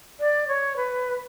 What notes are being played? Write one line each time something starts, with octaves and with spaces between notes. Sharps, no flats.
D5
C#5
B4